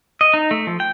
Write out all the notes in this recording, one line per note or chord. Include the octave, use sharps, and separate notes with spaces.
D#5
D#4
A3
F3
G5